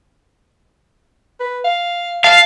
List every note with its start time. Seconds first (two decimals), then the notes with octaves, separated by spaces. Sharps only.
1.40 B4
1.65 F5
2.24 F5 A5